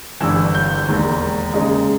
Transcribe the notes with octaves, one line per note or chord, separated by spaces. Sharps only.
G1 G2 E3 E6
G6
E1 D#2 D#3 G#3
D#2 C#3 G#3 D#4